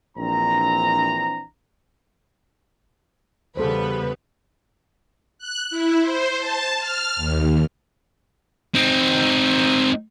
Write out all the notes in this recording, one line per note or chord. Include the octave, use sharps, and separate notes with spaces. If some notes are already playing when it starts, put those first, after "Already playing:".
A#1 E3 C4 D4 A#5
E2 C#3 G3 B3 A4 B4 C5
F#6
E4
C5
A5
F6
D#2
C4 D#4